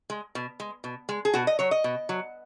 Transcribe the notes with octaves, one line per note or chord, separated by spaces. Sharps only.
G#3
B2
G#3
B2
G#3
G#4
B2 F#4
D#5
F#3 C#5
D#5
B2
F#3